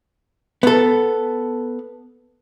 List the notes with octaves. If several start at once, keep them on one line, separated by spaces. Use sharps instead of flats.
B3 A4